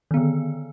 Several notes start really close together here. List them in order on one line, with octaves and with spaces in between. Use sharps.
D#3 B3 D3